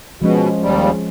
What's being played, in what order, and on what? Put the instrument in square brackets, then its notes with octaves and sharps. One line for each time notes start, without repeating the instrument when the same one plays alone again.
[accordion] B2 [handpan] F3 G#3 C#4
[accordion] D#2 G3